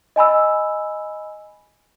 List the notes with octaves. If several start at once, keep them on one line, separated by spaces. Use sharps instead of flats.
D#5 G#5 B5 E6